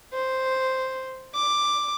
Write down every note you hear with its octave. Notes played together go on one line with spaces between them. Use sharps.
C5
D6